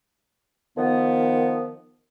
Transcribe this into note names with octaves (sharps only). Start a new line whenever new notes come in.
D#3 F3 B3